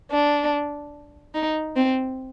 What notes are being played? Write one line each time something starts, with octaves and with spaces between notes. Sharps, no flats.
D4
D#4
C4